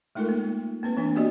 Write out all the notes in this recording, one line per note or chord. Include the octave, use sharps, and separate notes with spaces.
G#3 A3 D#4 F4 A4 A#4
A#3
A#3 C4 B4
E3 B3 C4 D4
A#3 B3 F#4 G4 D5 D#5